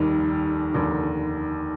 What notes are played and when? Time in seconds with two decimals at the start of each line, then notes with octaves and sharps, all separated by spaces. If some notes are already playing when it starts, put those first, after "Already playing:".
Already playing: F1 D#2 D#3 G3 D#4
0.73 F1 D#2 D3